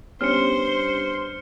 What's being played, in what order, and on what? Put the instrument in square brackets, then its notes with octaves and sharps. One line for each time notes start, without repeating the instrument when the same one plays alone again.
[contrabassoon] G2 [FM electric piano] B3 C#4 G4 [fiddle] C5 C6 [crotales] F6 C#7